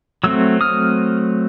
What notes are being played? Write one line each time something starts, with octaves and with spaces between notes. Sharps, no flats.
F#3 A3 C4 E6
D#6 F6